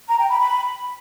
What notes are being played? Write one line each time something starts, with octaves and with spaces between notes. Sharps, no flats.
A#5
G5
B5
B5